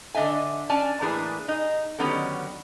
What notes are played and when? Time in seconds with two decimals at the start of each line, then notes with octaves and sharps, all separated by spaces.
0.15 D3 D4 D#5 E5 G#5
0.70 C#4 D4 D5 G#5 A5
1.01 A2 E3 A#3 D4 G#4 B4
1.48 D#4 G#4
1.99 D3 D#3 F#3 B3 C#4 G4